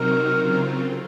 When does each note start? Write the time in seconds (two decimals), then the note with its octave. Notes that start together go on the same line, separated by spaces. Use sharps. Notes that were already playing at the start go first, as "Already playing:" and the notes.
Already playing: C3 F#3 C4 D#4 F#4 A#4
0.40 C#3 F#3 C4 F4
0.64 C5
0.76 A#4
0.89 A4